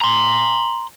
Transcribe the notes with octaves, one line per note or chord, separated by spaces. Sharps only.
A#5 C6